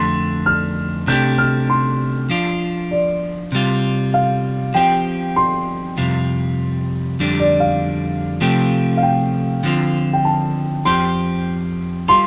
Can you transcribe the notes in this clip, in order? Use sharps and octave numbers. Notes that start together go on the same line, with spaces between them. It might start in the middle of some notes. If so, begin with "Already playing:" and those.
Already playing: F2 D3 A3 C6
F6
C3 A3 D4 G4 G6
F6
C6
F3 D4 F4
D5
C3 G3 F4
F5
F3 C4 G4 G5
C6
F2 C3 G3 F4
F2 D3 G3 D4
D5
F5
C3 F3 A3 C4 G4
F5
G5
D3 F3 C4 F4
G5
A5
F2 F3 C4 G4 C6
G3 F4 C6